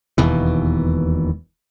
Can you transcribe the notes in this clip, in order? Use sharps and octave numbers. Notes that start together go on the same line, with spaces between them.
E1 D#2 B2 E3